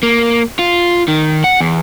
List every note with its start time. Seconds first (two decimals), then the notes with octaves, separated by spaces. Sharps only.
0.03 A#3
0.59 F4
1.08 D#3
1.44 F#5
1.61 E2